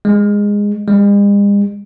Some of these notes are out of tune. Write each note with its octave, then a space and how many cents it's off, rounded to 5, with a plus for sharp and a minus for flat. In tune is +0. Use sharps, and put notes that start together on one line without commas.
G#3 -15
G#3 -45